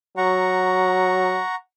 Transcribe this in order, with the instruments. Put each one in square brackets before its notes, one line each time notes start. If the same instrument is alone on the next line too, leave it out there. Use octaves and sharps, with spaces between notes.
[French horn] F#3 [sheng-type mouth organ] F#5 A#5 C#6